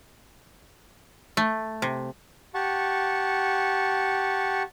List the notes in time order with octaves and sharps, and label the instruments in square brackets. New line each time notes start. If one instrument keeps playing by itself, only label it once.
[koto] A3
C3
[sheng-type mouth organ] G4 F#5 A5 C#6